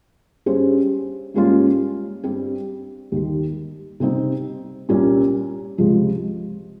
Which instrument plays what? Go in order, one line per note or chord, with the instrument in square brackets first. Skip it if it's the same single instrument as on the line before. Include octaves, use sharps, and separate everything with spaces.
[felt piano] G2 G3 C#4 G#4 C5
G#2 G3 A#3 C#4 F4
G2 G3 C4 G4
D#2 D#3 G3
C3 G3 C4 D#4
C2 A#2 G3 A#3 C#4
C#2 C3 F3 G#3